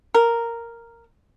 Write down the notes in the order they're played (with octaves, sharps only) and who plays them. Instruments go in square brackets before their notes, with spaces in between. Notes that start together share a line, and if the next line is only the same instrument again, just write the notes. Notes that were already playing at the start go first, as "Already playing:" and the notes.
[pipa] A#4